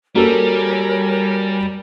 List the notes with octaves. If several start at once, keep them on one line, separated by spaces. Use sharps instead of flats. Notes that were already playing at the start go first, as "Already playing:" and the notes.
G3 A#3 F#4 A4 A#4 C#5 G#5